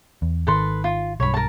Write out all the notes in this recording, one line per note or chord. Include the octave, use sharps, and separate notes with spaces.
E2
G#1 D#3 A4 B4 C6
F4
B1 G2 C#5 B5
A#4 A5